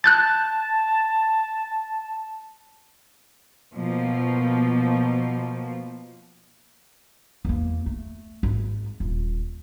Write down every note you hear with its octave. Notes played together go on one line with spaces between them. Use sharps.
A5 F#6 G6 A6
B2 F3 A#3
E2 A#3
A3
G#1
D#1